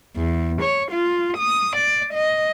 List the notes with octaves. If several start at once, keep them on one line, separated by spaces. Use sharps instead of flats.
E2
C#5
F4
D#6
D5
D#5